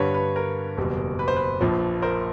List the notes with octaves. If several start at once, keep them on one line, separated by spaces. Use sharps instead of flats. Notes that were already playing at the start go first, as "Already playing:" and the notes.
Already playing: G2 D3 G3 B4 C#5
B4
A#4
F#1 E2 B2 G3
B4
C5
B4
A#1 A#2 F3
A#4 C5